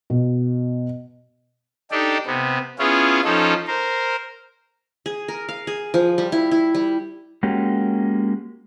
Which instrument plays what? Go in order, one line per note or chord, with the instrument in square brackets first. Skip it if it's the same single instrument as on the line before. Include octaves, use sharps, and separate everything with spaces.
[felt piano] B2
[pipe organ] D4 D#4 G4 A4 D5
C3 B3
B3 C#4 E4 F4 G#4
F3 C#4 D#4 F4 A4
A#4 C5
[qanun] G#4
A#4
F5
G#4
F3
G3
E4
E4
G3
[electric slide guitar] G#3 A#3 C#4 F#4 G4